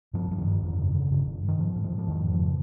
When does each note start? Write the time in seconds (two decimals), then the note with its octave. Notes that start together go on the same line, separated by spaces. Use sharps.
0.14 G2 F3
0.31 G2 F3
0.38 D#3
0.46 G2
0.62 F2
0.79 C#3
0.95 C#3
1.11 G2
1.27 G2
1.43 G2
1.48 D#3
1.59 G#2 F3
1.76 G#2
1.84 F3
1.92 G#2
1.98 F3
2.07 F2 D#3
2.24 F2
2.32 F3
2.40 C#3